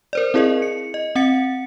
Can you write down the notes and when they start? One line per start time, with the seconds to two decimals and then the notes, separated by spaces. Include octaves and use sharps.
0.13 A#4 C5 D5
0.34 C4 E4 G#4 A#4 D#5
0.62 C#7
0.94 D#5
1.15 C4 F#5 A6 C#7